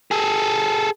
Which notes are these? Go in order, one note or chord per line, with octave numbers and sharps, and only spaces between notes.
G#4 A4